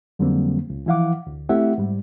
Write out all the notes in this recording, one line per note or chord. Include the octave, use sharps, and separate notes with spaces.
F2 D3 F#3 G3 A#3 C4
C#2
E3 F3 E4 F5 F#5 D6
D2
A3 C4 E4 G4 E5 F#5
G#2 G3